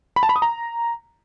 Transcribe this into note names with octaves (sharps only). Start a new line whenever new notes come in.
B5
A5
B5
D#6
A#5